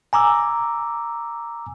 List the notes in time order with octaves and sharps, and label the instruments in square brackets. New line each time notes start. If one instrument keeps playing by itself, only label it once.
[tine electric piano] G#5 A#5 D6 E6